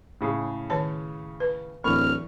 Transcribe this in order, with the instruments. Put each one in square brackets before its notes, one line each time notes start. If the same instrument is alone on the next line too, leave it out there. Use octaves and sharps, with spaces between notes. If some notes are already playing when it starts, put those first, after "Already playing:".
[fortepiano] A2 C#3 G#4
[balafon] D#3 C#5 A5
B4
[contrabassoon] D1 [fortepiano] E2 C#6 [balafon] D3 [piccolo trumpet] F6